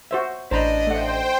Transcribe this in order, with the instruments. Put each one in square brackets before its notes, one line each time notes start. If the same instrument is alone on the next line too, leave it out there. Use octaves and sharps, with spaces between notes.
[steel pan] F#4 C5 E5
[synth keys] A1 [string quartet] D4 D#5 [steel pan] C5 A#5 B5
[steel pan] A3 F#5 [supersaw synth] C5 G5